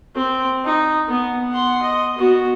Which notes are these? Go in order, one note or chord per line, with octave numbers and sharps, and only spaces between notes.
C4
D#4
B3
F#5 C6
D#5
B3 F#4